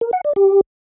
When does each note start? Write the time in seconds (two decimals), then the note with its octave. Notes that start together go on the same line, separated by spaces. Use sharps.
0.01 A#4
0.13 F#5
0.25 D5
0.36 G4